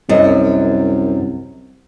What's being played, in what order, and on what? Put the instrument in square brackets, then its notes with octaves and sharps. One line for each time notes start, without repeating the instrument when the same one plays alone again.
[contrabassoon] C2 [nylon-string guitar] F#2 D#5